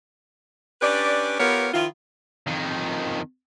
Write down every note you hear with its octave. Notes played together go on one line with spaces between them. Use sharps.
C#4 D4 G4 B4 D5
B3 F4 G4 A#4 B4 C#5
D#3 F3 E4 F4
F2 D#3